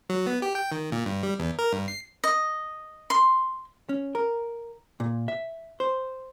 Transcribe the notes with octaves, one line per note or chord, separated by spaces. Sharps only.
F#3
B3
G4
G5
D#3
A#2
G2
G3
E2
A#4
G2
C7
D#5
C6
C#4
A#4
A#2
E5
C5